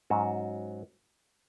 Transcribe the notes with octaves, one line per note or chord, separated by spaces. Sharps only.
G#2 F#3 C#4 F#4